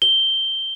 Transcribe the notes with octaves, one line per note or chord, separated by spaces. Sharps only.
G7